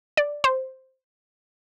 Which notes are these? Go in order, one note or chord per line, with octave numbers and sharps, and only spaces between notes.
D5
C5